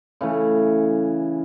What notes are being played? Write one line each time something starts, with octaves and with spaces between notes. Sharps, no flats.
C#3 E3 A3